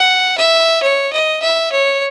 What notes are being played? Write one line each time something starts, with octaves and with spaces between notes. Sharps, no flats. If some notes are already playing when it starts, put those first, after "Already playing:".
Already playing: F#5
E5
C#5
D#5
E5
C#5